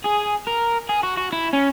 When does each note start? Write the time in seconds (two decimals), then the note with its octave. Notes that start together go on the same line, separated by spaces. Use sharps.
0.04 G#4
0.47 A#4
0.89 G#4
1.03 F#4
1.17 F#4
1.33 E4
1.53 C#4